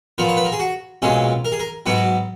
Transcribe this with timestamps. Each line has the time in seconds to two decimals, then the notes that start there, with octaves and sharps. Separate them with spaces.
0.18 A#2 F3 B3 A#4
0.29 C#5
0.37 B4
0.45 A#4
0.52 G#4
0.59 F#4
1.02 B1 A#2 G#3 C#4 G#4
1.45 A#4
1.52 G#4
1.60 A#4
1.86 G#2 F#3 B3 F#4